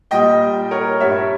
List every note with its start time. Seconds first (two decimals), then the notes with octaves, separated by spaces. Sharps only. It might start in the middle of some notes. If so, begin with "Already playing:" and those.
0.11 A#2 G3 D#5 G5
0.71 A#4 C#5
1.00 G2 G3 C#5 E5